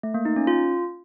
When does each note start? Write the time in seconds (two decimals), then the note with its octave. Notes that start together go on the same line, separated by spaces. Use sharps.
0.03 A3
0.14 A#3
0.25 D#4
0.36 C#4
0.47 F4